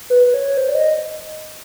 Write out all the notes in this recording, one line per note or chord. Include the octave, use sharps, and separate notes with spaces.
B4
C#5
C5
D5
D#5